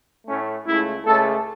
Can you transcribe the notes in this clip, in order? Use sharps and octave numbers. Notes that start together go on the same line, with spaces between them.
A2 A3 C#4
C#2 C#3 A3 E4
C#2 C#3 A3 A4